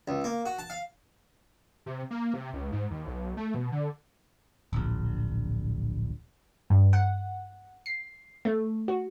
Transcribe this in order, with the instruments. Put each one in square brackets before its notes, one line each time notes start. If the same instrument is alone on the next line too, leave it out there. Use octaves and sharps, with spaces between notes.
[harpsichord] C#2
A#3
F#4
A5
F5
[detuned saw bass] C3
A#3
C3
C#2
G#2
D#2
B1
A3
B2
D3
[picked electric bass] D1 A#1
[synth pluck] G2
F#5
C7
A3
F#4